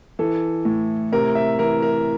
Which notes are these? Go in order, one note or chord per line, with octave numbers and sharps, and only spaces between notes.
E3 A4
A2
C3 A#4
E5
E3 A#4
A#4